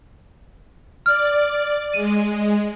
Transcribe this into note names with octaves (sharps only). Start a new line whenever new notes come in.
D5 F6
G#3 D#7